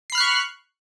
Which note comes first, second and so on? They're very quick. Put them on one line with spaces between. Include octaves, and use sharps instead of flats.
C7 B5 F6 F#6 C#6